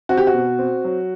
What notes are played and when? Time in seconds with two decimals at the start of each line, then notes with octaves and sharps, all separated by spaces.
0.09 C4 F#4
0.17 G4
0.27 F#4
0.34 B2
0.59 C4
0.85 F#3